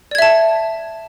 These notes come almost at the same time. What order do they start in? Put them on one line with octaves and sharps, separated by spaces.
D5 G#6 E5 A5